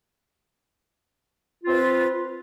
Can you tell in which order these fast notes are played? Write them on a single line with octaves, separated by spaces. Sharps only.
F4 C4 B4